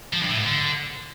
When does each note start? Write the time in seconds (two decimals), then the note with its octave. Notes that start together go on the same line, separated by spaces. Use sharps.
0.13 F3
0.21 G2
0.30 A2
0.38 G#2
0.46 D3